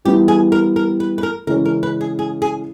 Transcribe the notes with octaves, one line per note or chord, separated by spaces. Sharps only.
E3 G3 B3 E4 G4
G#4
A#4
A#4
B4
B4
A#4
C#3 E3 G#3 C#4 A#4
A#4
B4
G#4
G#4
G#4